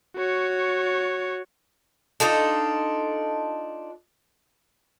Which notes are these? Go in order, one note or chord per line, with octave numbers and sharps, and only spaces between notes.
F#4 C#5
D4 D#4 F4 A4